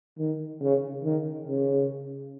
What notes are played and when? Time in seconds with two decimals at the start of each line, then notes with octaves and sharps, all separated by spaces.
0.19 D#3
0.62 C#3
1.04 D#3
1.47 C#3